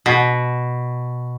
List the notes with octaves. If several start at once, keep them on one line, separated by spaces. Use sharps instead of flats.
B2